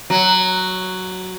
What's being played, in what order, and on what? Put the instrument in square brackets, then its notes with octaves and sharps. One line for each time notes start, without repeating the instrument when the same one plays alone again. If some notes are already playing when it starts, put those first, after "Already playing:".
[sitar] F#3